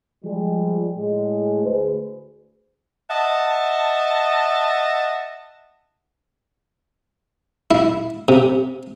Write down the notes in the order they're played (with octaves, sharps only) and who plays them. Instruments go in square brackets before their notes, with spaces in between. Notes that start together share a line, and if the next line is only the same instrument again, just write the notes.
[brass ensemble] F3 G3 G#3
A2 G#3
D2 G#4 B4 C5
[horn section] D#5 E5 F#5 A5
[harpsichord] E4
C3